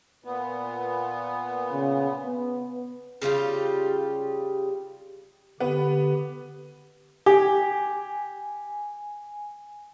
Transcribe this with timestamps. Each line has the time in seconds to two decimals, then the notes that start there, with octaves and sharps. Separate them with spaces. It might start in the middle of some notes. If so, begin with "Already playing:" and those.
0.25 A#2 B3
1.72 C#3
2.26 B3
3.22 C#3 G3 F4 G4
5.60 D3 B3 G4
7.26 G4 G#5